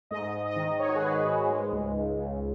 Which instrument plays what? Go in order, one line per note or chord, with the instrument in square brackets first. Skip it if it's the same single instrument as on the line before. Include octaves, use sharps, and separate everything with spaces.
[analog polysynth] G#2 D#5
G#2
D#5
D#3
D#3 C#5
F#4
G#4
G#2 B4
G#2 F#4
G#3
C#2
C#2
C#2